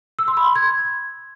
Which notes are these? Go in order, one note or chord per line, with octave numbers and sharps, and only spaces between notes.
E6
C6
B5
C6
G#6